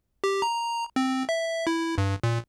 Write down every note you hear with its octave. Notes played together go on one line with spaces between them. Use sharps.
G4
A#5
C4
E5
E4
G2
A#2